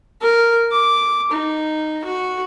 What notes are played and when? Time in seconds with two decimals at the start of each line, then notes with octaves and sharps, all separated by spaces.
0.22 A#4
0.72 D6
1.32 D#4
2.04 F#4